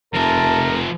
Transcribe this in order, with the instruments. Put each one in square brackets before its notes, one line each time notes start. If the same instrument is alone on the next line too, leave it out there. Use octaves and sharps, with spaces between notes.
[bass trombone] F1 [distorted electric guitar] F3 E5 [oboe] A#4 [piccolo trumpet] A5